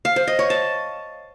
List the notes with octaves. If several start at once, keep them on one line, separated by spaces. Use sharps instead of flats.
F5
C5
D#5
C#5
A5